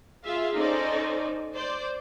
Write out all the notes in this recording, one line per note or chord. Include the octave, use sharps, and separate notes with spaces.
F4 G#4 E5 F5
C#4 D#4 A4 C5 D5
C5 D5